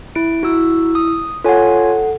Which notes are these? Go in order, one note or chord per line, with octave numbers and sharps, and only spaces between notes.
E4 D7
E4 F#4 E6
D#6
F4 A4 C#5 F#5 G#5